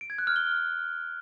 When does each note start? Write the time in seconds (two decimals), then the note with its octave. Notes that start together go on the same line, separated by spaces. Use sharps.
0.01 D7
0.10 G#6
0.18 F#6
0.27 F6
0.36 G7